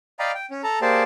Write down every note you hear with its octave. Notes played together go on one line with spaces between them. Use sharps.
D5 D#5 F5 G5 A#5 B5
G5
C#4
A4 A5 A#5
A#3 G4 G#4 C5 D5 A5